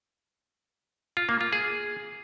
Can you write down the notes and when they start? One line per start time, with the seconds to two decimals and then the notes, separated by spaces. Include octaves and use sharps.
1.17 F4
1.29 A#3
1.41 F4
1.53 G#4